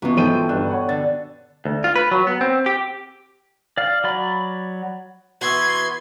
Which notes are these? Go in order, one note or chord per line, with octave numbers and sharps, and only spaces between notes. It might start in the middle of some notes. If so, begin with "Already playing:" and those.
C#2 B2 E3
G#2 F3 A4 G5 D#7
G1 G2 D4 F#6
C#5 F#5
D3 A6
D2
F4
B4
F#3
B3
C4
G4
D5 F5
F#3 D5 B5
E3 B3 F#4 C6 G#6